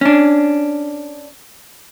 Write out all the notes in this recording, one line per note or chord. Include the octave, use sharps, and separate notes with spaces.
C#4 D4